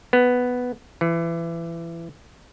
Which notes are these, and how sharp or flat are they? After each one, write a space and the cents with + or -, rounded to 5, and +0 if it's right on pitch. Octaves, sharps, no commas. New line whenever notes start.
B3 +5
E3 +25